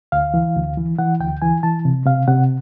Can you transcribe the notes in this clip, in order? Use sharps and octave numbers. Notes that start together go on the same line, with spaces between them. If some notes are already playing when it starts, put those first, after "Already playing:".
D2 F5
E3
D2
E3
E3 F#5
D2 G5
E3 G#5
E3 A5
C3
C3 F5
C3 F#5